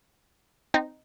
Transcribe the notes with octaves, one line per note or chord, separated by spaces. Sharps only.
C4 D#4